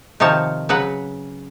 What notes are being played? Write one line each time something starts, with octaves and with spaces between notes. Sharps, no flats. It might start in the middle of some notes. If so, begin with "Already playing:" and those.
C3 D#3 F3 C#5 A5
C#3 F#3 B4 F#5